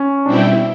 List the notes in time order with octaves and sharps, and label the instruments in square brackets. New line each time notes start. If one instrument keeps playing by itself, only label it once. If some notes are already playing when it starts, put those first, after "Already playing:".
Already playing: [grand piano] C#4
[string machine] B2 G3 C4 E4 G4 [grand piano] D4
[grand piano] E4